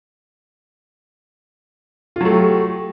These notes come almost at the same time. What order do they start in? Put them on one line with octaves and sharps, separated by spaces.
F4 F#3 A3 G4